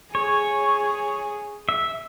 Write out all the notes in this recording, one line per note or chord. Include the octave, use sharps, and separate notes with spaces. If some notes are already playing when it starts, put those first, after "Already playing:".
G#4 C#5
E5